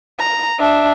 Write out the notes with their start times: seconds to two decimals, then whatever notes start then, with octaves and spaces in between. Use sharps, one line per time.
0.19 A#5
0.58 D4 E5